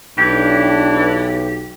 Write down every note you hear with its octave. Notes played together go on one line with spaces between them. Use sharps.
B1 E3 D4 G4